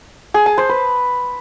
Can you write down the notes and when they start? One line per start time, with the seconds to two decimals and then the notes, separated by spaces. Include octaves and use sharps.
0.34 G#4
0.46 A5
0.58 C5
0.69 B4